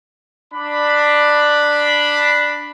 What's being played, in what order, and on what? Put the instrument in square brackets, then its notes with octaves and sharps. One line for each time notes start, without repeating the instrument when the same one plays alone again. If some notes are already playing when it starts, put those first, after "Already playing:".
[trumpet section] D4 B5